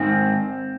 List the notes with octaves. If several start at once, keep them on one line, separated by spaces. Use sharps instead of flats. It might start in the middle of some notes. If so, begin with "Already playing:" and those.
Already playing: G#2 D#3 C4